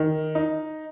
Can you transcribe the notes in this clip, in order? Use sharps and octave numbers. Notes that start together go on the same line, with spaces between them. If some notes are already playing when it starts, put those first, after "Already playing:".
Already playing: D#3
D#4